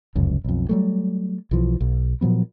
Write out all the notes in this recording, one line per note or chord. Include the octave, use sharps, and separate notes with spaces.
F1 C#2 F#2
B1 F2
F#3 G3 A3
B1 E3 F3
B1
A#2 F3 F#3 B3